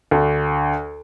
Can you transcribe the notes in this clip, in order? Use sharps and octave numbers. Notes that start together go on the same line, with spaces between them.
D2